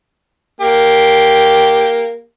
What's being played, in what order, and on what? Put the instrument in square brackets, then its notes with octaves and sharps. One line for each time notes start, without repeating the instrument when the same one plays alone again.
[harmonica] A#3 G4